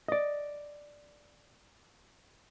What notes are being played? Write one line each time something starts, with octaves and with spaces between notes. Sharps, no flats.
D5 D#5